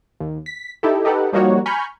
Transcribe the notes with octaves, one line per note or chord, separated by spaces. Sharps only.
D#2
B6
D#4 E4 G4 A4
D#4 G4 A4 B4 F#5
F3 G3 A#3 D#4 F#4 C#5
G#5 A#5 B5 C#6 F6 G6